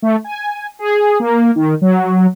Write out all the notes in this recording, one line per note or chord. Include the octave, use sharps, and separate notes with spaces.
A3
G#5
G#4
A#3
D#3
F#3